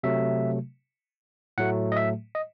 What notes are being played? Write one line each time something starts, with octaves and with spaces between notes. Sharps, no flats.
C3 F#3 A3 E5
A2 F#3 A3 F#5
D#5
E5
D#5